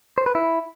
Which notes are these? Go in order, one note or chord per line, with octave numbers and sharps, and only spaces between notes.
C5
B4
E4